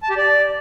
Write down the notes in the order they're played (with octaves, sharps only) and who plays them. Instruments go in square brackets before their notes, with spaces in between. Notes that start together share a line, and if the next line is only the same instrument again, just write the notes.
[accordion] A5
G4
D5